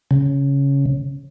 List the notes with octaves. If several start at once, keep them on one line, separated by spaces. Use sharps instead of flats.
C#3